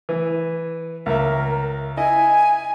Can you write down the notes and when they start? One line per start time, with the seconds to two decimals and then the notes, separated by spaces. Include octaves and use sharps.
0.09 E3
1.06 C#2 A#4 E5
1.97 E4 D#5 G#5